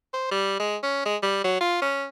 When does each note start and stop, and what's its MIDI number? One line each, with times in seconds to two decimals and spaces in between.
0.14 0.29 72
0.31 0.59 55
0.59 0.77 56
0.83 1.01 61
1.05 1.16 56
1.22 1.40 55
1.44 1.59 54
1.61 1.79 65
1.82 2.05 61